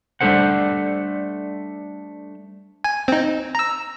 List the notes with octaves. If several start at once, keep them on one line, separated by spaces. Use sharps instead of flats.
G3 A3 D4 A4 C5 F#5
G#5
C4 D#4
A#5 E6